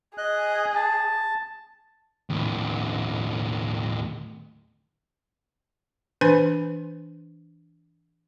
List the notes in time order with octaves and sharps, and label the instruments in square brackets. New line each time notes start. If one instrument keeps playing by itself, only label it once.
[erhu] G#4 [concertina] D#5 F#6
[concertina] A5
[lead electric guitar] D#2 A2
[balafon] E3 D4 B4 C5 G#5 B5